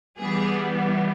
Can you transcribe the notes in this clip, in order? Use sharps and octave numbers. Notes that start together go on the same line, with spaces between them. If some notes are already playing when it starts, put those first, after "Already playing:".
E3 G3 B3 G#4